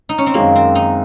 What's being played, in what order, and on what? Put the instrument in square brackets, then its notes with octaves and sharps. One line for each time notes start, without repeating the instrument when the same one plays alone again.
[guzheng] D#4
C#4
C4
[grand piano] F#2 D#3 G#3 [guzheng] A#3
[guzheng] C4
D#4